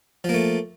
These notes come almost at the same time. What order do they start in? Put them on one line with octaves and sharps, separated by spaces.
F3 A#3 A3